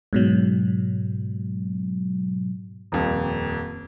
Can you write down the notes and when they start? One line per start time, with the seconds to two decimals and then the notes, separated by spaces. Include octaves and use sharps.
0.13 G#2 B2 F#3
2.92 D#1 F2